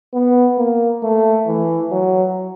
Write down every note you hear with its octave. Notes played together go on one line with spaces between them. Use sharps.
B3
A#3
A3
E3
F#3